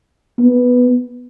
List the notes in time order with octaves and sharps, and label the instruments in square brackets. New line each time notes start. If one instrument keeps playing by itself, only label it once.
[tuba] B3